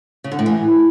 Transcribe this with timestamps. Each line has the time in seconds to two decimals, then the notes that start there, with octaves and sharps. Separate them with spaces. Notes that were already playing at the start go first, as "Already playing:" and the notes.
0.24 C#3
0.32 D3
0.39 A2
0.46 E3